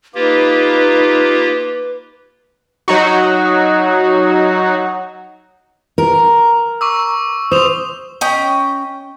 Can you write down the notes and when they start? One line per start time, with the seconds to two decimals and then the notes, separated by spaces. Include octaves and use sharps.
0.15 A#3 D#4 F4 G4 B4
2.88 F#3 D#4 F#4
5.98 A#4
6.81 C#6 D6 E6
7.52 C5 D#6 F7
8.21 C#4 D#5 G5